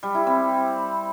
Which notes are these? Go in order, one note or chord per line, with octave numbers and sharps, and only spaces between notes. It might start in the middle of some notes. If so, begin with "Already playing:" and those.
G3
E4
C4